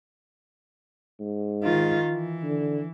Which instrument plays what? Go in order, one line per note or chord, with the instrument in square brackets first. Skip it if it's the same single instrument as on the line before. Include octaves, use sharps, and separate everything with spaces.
[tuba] G#2
[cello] D#3 F4
E3
[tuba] D3